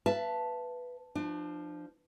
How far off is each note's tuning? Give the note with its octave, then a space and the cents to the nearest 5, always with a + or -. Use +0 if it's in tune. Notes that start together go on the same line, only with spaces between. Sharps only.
B4 +0 E5 +45 A5 +0
F3 -5 D4 +35